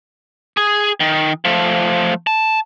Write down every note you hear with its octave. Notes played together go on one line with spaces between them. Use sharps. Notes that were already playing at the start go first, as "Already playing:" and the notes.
G#4
D#3
F3 A3
A5